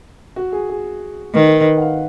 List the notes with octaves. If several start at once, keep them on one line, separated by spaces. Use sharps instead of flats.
F#4
G#4
G#4
D#3 B4
A#4
B4
F#5
F5